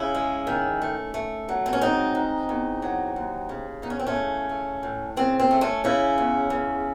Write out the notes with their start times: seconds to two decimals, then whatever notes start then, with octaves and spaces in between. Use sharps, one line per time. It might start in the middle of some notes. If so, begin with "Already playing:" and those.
Already playing: C#3 C#4 E4
0.15 G#3
0.47 D#3
0.82 A3
1.14 A3
1.49 F#3
1.66 C4
1.73 C#4
1.81 G#2 C4 D#4
2.15 G#2
2.49 E2
2.82 F#3
3.16 D#2
3.49 C#3
3.82 E2 D#4
3.90 C#4
3.99 C4
4.07 A3 C#4
4.16 C#3
4.49 A3
4.83 A2
5.17 C#3 C4
5.39 C4
5.51 A3
5.61 A3 C#4
5.84 C#3 C#4 E4
6.18 E2
6.50 C#3